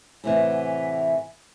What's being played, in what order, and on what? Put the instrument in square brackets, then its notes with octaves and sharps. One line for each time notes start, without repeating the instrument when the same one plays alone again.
[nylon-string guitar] A2 C3 E3 [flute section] E5 F#5 G#5